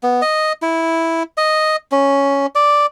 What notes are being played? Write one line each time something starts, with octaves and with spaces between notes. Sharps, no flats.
B3
D#5
E4
D#5
C#4
D5